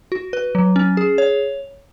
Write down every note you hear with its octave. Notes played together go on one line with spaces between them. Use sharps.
F#4
B4
F#3
C#4
G#4
C#5